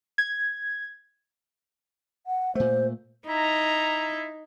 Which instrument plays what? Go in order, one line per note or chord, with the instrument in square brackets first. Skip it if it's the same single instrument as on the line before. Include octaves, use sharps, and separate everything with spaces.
[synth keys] G#6
[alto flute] F#5
[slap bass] A#2 A3 [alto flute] C5
[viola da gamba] D#4 [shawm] E4 [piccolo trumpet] A#5